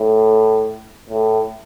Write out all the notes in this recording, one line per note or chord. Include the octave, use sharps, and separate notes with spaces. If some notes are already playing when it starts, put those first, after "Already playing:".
Already playing: A2
A2